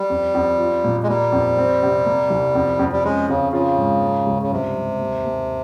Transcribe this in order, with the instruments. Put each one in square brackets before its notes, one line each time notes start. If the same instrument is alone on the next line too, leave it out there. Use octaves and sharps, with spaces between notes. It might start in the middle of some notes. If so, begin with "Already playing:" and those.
Already playing: [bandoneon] G3
[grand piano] F2
F2
F4
A#2
[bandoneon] G#3
[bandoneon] G3 [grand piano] A#3
[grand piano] F2
C4
C3
A#3
C2
F2
F2
[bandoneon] G3
[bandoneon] G#3 [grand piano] C#4
[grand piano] F2 [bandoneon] C#3
[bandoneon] C#3 [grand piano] F4
[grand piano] G#2
A#3
C#2
[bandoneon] C#3
[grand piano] G2 [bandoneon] C3
[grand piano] G2
D#2
D#2